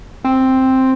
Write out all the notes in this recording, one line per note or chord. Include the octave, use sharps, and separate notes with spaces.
C4